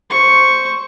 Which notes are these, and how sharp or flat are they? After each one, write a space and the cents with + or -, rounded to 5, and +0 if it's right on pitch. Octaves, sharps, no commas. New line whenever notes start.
C5 +0 C#6 +0